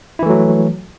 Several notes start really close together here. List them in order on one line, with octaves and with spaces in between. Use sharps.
E4 E3 A3 F#3